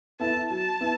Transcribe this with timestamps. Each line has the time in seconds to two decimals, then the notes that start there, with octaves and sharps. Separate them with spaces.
0.20 B3 E4 A4 A5
0.50 F#3 A5
0.81 B3 E4